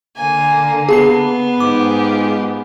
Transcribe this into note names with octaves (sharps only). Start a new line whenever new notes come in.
D3 A#3 G#5
B3 G#4 A5 C7
G#2 F4 G4 G#4 D6